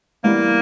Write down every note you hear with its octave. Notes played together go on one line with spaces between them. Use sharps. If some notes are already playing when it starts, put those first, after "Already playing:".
E3 G3 A#3 B3 E4